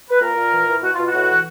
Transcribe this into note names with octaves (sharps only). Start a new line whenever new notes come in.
B4
A#2 A#4
A#2
E3
E3
B2 F#4
B2 F4
F#4
A2
E3